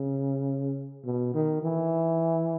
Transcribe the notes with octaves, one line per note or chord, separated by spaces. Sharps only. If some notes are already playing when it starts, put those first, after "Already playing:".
Already playing: C#3
B2
D#3
E3